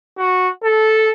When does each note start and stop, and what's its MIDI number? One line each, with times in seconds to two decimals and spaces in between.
0.18 0.49 66
0.63 1.12 69